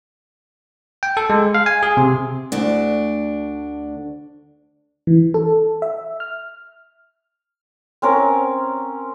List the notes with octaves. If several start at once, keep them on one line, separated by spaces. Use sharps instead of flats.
G5
A4
G#3
F5
G#5
G#4
C3
D2 D4
E3
A4
E5
F6
C4 C#4 A#4